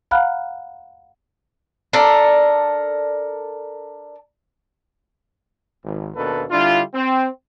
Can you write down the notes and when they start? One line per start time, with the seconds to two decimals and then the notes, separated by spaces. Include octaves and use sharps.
0.11 F5 F#5 A#5 B5 F6 F#6
1.93 D4 A4 A#4 D5
5.84 G#1
6.15 D#2 B2 A#3 D4 A4 B4
6.51 D3 G3 D4 E4 F4
6.94 C4